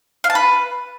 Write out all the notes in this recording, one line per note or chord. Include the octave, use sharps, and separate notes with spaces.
F5
A5
B4